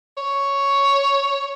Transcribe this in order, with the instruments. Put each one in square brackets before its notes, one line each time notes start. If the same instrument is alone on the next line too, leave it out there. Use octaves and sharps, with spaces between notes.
[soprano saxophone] C#5